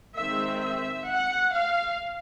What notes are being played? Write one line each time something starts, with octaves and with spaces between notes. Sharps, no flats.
D#3 G#3 C4 E5
E5
F#5
F5